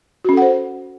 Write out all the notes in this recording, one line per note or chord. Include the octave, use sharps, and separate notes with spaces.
C#4 F#4 A4 C5 F#5